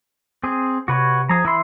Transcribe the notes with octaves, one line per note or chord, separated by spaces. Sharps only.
C4 G#4
C3 F#4 B4 C#5
F3 G#4 A#5
E3 E5 B5 C6